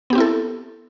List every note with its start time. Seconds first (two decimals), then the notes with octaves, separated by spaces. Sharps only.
0.10 B3
0.13 G4
0.15 C4
0.18 E4
0.20 A4